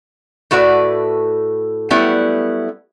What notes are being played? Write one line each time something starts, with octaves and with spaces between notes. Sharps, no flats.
A2 A3 F#4 B4 D5
F#3 G3 A3 B3 E4